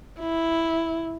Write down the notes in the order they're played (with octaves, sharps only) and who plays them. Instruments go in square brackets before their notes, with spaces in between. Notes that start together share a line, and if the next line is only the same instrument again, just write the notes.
[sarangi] E4